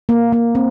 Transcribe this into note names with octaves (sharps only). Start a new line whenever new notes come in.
A#3
A#3
C4